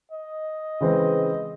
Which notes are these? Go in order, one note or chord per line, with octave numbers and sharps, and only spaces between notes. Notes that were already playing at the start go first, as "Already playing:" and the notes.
D#5
C#3 E3 G#3 C4